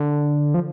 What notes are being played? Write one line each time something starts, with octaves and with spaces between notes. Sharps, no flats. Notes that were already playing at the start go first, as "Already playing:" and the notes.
Already playing: D3
F3